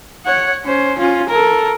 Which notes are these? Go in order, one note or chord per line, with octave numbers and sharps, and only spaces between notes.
C#5 F#5
C#4 C5
C#4 F4
A4 A#4